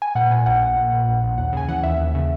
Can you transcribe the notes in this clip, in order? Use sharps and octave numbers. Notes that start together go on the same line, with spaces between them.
G#5
A#2 F#5
A#2 G#5
A#1 F#5
A#1
A#2
A#2
A#1
A#1
D#2 F#5
C#3 G#5
E3 F#5
D#2 E5
D#2
C#3